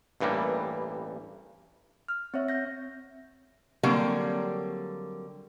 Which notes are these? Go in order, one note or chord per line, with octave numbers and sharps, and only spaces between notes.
A1 G2 E3 G3 A#3
F6
C4 C#5 E5
G6 A#6
D3 F#3 G3 A#3 C4